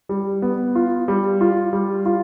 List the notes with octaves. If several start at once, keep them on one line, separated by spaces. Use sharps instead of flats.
G3
B3
F4
G3
F4
G3
F4